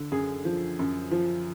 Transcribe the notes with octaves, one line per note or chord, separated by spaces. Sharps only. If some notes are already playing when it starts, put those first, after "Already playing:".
Already playing: D3
F#2 G#4
F3
F#2
F3